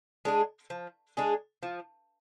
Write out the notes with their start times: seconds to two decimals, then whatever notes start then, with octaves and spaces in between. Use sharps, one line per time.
0.25 G#3 D4 G#4
0.70 F3
1.17 G#3 D4 G#4
1.63 F3